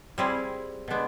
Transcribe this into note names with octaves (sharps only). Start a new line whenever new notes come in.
G3 C4 E4 G#4
B2 G#3 B3 D4